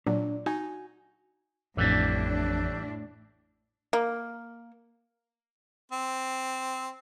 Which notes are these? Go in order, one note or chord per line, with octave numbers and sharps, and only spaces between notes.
A#2 F#3 D4
D#4 F#4 G#5
A1 F2 A2 E3 G3 D4
A#3
C4